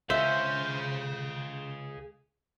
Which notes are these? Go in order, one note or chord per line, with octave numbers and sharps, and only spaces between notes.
C#2 G#4 C5 E5 F5